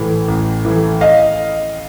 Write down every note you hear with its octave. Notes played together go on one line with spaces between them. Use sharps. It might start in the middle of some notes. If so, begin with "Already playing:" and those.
Already playing: A1 A2 E3
A1
A2 E3
D#5 F5